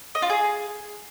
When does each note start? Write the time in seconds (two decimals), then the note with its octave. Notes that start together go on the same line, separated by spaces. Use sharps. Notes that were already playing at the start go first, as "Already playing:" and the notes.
0.15 D#5
0.22 F4
0.30 G#4